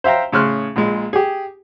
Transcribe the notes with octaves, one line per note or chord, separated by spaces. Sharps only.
C5 E5 F5 G5 A#5
A2 C#3 C6 F6 F#6
A#1 A#2 G#3
G4 G#4